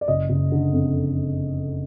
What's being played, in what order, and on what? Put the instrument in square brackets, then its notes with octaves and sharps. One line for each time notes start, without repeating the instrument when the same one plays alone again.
[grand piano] D5
F#1 D#5
F#1
D3
F2